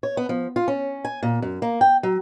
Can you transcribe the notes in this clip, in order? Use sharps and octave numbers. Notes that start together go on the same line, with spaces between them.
C#5
B3
F3
F4
C#4
G#5
A#2
F#2
A#3
G5
F#3